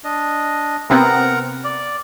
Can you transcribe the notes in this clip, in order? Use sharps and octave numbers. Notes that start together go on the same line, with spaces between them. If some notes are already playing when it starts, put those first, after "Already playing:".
D4 D#5
C3 B3 C4 A#4 F#5 A#5
D5